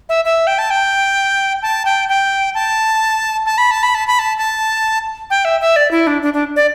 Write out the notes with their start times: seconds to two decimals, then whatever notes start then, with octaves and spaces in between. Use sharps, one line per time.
0.09 E5
0.25 E5
0.47 G5
0.59 A5
0.70 G5
1.63 A5
1.85 G5
2.09 G5
2.55 A5
3.46 A5
3.58 B5
3.71 A5
3.83 B5
3.95 A5
4.07 B5
4.19 A5
4.38 A5
5.30 G5
5.45 E5
5.61 E5
5.76 D5
5.91 E4
6.07 D4
6.22 D4
6.34 D4
6.56 D5